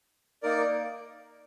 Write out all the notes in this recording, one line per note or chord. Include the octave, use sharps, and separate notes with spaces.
A#3 D#4 A#4 D5